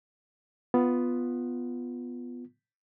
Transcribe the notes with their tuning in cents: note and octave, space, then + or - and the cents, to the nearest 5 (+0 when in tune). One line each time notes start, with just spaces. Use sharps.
B3 +5 F4 +0